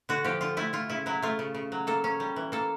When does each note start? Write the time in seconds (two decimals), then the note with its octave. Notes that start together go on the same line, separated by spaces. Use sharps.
0.09 D3 F#4
0.24 F3 G4
0.41 D3 F4
0.57 A3 E4
0.73 A3 F4
0.89 C#3 E4
1.06 F#3 E4
1.22 A3 F4
1.39 C#3
1.55 C#3
1.72 F#3
1.87 A#3 A4
2.04 C#4
2.20 G3
2.36 E3
2.52 A#3 A4